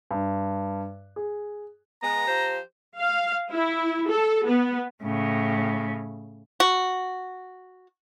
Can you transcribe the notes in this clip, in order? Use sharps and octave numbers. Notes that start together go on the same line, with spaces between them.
G2
G#4
G#3 B3 A#5
F3 G4 C5
F5
E4
A4
B3
A2 C#3
F#4